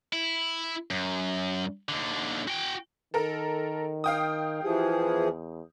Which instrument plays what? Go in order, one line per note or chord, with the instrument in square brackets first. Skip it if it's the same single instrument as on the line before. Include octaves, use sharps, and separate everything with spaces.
[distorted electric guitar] E4
F#2
D#2 D3
F#4 G5
[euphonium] D#3 [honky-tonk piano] A4 A#4
[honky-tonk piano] F5 G5 D#6
[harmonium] E3 F3 G#4 [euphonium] G4
[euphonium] E2